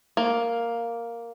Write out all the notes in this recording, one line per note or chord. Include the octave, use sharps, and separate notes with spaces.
A#3